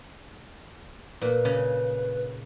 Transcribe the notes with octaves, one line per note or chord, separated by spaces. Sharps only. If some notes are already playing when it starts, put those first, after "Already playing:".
A#2 B4
C#3